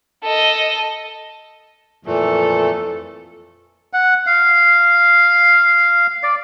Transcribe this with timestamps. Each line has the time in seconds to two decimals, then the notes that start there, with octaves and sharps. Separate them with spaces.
0.24 A4 D#5
2.06 F2 A#2 E3 A3 A4
3.93 F#5
4.27 F5
6.23 D5